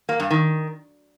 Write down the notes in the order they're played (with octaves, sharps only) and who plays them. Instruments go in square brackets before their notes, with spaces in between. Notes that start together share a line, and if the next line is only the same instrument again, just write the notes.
[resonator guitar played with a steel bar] A#3
G2
D#3